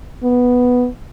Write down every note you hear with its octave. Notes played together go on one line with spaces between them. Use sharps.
B3